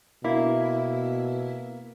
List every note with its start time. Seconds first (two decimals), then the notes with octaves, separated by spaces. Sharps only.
0.24 B2 A#3 E4